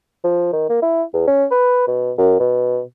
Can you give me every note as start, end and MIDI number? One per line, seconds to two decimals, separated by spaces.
0.24 0.50 53
0.53 0.68 51
0.70 0.82 58
0.82 1.03 64
1.13 1.23 40
1.27 1.45 61
1.51 1.85 71
1.87 2.12 47
2.18 2.36 42
2.40 2.81 47